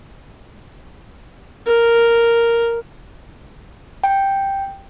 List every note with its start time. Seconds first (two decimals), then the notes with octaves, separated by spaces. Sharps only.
1.67 A#4
4.04 G5